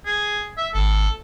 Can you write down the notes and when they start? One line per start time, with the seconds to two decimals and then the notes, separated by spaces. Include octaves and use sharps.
0.06 G#4
0.58 E5
0.74 G#1 A4